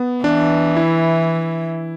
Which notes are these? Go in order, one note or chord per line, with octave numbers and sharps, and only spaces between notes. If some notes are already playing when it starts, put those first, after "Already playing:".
Already playing: B3
E3 D4
E4